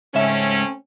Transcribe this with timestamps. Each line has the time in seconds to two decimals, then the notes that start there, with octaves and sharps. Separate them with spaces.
0.15 C#2 G#2 A3 C4 C#4 E5